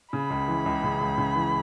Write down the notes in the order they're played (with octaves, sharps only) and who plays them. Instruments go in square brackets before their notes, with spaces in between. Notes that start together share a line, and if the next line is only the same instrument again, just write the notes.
[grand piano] C#3 [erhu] B5
[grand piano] C#2
E3
C#2
C#3
C#2
C#3
E3